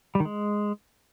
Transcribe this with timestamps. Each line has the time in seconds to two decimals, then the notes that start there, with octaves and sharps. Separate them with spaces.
0.15 G3
0.20 D#3
0.25 G#3